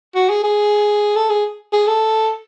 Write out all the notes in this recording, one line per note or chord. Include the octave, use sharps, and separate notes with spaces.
F#4
G#4
G#4
A4
G#4
G#4
A4